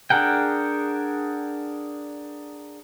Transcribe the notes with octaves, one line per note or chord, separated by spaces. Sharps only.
D4 G#4 A#4 F#5 G5